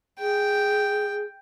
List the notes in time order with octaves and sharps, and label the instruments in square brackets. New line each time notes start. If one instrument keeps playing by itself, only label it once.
[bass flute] G#4 [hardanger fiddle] G5